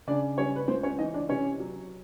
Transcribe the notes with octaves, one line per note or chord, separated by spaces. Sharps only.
C#3 D4 D5
G3 C#4 C#5
B4
C#2 C4 C5
C#4 C#5
E3 D#4 D#5
D4 D5
C3 C#4 C#5
F#3